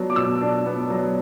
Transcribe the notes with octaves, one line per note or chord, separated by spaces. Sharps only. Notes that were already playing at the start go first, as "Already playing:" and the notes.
Already playing: F#3 B3 D4
D6
B2 E6
D4
B3
F#3